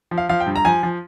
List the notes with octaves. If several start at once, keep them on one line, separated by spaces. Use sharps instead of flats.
F3
F5
F3 F5
G5
G2
A#5
F3 G#5
F3